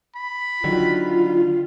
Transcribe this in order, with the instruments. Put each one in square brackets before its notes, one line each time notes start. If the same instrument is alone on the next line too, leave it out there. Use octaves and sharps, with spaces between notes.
[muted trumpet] B5
[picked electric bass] D3 D#3 F#3 [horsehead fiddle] F4